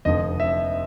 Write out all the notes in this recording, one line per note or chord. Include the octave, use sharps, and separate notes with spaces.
F1 F2 D3 F3 D#5
E5